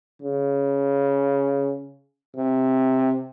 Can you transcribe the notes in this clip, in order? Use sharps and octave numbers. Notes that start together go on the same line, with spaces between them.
C#3
C3